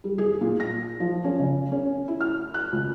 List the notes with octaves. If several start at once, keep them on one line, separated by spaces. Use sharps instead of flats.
G3
G#4
A#2
A#6
F3
C#4
C#3
C#4
E4
F6
F#6
C#2